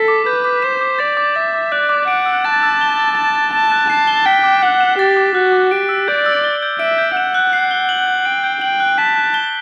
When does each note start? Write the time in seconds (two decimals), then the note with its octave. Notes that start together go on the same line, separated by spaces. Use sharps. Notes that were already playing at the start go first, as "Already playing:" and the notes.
Already playing: A4 B6
0.08 D6
0.26 B4 G6
0.44 D6
0.62 C5 E7
0.81 D6
0.99 D5 A6
1.17 D6
1.35 E5 A6
1.54 D6
1.72 D5 F#6
1.89 D6
2.08 F#5 D7
2.26 E6
2.44 A5 A6
2.63 E6
2.81 G7
2.99 A6
3.17 A5 E7
3.35 A6
3.53 A5 E7
3.72 F#6
3.90 A5 C7
4.07 G7
4.26 G5 B6
4.44 D6
4.62 F#5 F#6
4.80 E7
4.98 G4 A6
5.17 D6
5.35 F#4 F#6
5.53 D6
5.71 G4 D7
5.89 E6
6.08 D5 G6
6.26 E6
6.44 G7
6.63 G6
6.80 E5 D7
6.98 G6
7.16 F#5 E7
7.34 F#6
7.53 C7
7.71 G7
7.89 F#7
8.07 G6
8.25 G5 D7
8.44 G6
8.61 G5 F#7
8.80 F#6
8.98 A5 B6
9.16 F#6
9.34 G7